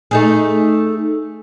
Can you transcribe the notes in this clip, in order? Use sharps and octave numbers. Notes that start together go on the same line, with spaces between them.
A3 D#4 G#4